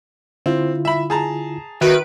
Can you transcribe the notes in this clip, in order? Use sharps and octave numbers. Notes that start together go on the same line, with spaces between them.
D3 C4 E4 F4
E5 B5
G#4 A5 A#5
D#3 F#4 B4 E5 D7